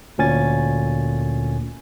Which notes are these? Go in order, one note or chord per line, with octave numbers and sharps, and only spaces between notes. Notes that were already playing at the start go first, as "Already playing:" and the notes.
D2 A#2 C#4 G#5 A6